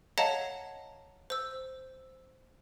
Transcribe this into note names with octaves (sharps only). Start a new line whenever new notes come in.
C#5 D#5 F5 F#5 A5 A#5
C5 E6